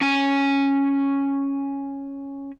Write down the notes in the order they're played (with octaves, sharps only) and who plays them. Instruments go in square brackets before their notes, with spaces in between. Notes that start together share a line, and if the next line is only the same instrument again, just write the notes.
[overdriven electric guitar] C#4 G#5